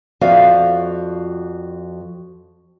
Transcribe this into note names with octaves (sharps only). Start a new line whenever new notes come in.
F2 F3 F#4 D5 E5 F5